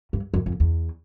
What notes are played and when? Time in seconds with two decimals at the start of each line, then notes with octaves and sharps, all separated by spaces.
0.13 G2
0.34 F#2
0.46 F2
0.60 E2